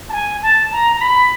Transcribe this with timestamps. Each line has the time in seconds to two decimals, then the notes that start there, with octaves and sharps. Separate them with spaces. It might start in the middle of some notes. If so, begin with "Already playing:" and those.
0.09 A5
0.13 G#5
0.42 A5
0.72 A#5
0.96 A#5
1.01 B5